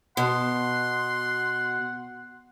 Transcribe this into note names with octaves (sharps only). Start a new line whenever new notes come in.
B2 F#5 C6